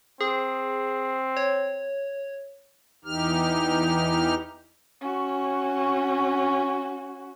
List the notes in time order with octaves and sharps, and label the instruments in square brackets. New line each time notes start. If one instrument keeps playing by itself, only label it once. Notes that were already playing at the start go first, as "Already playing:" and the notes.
[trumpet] C4 [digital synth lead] G#4
[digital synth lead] C#5
[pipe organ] E2 E3 D#4 G4 F6
[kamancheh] C#4 F#4